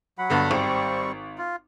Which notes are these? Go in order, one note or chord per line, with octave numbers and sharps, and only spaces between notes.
F#3 F#5 B5
G2 D3 B3
G#1 G3 C4 C#6
F4